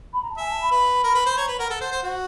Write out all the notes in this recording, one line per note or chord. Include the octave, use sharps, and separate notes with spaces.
B5
A#5
A5
E5 G#5
A5
B5
B4
A#4
B4
C5
B5
C#5 A#5
B4
A#4 F#5
A4 F#5
C5
C5
F#4